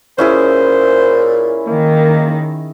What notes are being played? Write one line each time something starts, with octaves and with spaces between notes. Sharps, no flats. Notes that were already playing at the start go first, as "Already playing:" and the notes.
A#2 C#4 E4 G#4 C5
D#3 A#3